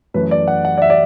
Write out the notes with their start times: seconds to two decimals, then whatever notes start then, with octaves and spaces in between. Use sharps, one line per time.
0.14 F#2 E3 A3 B4
0.31 D5
0.48 F#5
0.65 F#5
0.78 D5
0.82 E5
0.90 D5